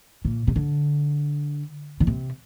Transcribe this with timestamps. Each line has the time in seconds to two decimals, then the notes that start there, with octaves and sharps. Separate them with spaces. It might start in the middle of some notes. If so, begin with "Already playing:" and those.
0.25 A#2
0.47 C3
0.56 D3
2.00 D3
2.07 C3